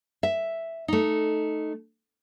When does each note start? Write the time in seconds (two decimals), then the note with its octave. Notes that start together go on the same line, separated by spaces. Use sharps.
0.23 E5
0.88 A3 D#4